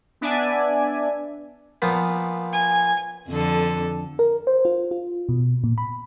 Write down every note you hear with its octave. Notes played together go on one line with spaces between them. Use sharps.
B3 D4 D5 E5 G#5
A#2 F3 B3
G#5
F2 D3 A4
A#4
C5
F4
F4
B2
A#2
B5